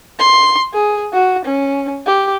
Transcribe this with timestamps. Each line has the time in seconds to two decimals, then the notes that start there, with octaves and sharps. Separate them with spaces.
0.19 C6
0.74 G#4
1.13 F#4
1.45 C#4
2.07 G4